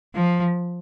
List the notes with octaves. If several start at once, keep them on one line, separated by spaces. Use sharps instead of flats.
F3